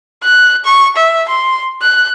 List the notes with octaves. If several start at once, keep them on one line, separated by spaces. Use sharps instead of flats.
F#6
C#6
E5
C6
F#6